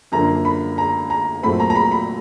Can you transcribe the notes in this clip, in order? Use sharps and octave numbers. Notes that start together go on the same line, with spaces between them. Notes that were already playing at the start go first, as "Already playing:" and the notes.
F#2 D3 F3 A#3 D4 A#5
B5
A#5
A#5
A#2 F#3 A3 C4 B5
A#5
A#5
B5
B5